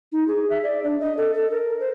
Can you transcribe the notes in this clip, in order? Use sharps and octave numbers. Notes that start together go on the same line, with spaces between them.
D#4
G#4
E5
D5
D4
D#5
A4
A4
A#4
C5